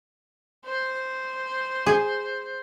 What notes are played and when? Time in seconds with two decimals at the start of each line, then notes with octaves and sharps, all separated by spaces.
0.65 C5
1.86 G#4